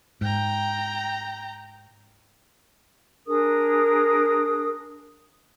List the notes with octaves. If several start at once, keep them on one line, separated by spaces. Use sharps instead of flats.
G#2 G5 A#5
D4 G#4 A#4 D#6